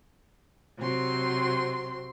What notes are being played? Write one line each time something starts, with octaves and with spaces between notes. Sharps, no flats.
C3 F#3 C4 C6